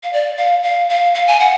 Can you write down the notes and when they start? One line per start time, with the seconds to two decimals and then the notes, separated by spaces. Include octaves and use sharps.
0.03 F5
0.13 D5
0.38 F5
0.63 F5
0.89 F5
1.15 F5
1.27 G#5
1.40 F#5